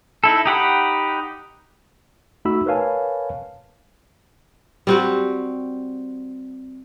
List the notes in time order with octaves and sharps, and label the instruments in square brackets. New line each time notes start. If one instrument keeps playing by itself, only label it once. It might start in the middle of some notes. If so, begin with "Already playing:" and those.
[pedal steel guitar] D#4 E4 A4
D#4 G4 F#5 B5
[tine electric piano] A3 D#4 F#4 B5 E6
A#4 B4 C#5 F5 G#5 A5
[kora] G3 C4 F#4